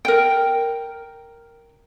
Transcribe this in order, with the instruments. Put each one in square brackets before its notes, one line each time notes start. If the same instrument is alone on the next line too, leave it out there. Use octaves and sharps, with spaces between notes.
[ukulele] A#4 G5